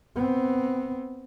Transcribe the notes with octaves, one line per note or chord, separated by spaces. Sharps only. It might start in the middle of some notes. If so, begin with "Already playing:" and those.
B3 C4